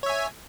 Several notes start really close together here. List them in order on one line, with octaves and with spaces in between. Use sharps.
C#5 E5 G#5